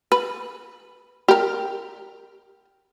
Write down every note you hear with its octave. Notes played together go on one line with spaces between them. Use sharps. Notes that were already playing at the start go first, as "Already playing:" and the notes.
B4
G4 A#4